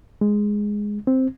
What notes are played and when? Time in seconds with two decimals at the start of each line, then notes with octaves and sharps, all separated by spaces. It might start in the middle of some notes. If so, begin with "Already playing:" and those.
0.21 G#3
1.07 C4